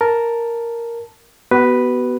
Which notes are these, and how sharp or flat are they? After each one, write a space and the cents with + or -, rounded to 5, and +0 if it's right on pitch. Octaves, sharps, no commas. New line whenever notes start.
A#4 +0 A5 +0
B3 +0 F#4 +35 B4 +0